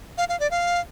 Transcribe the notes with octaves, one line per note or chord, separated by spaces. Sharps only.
F5
F5
D5
F5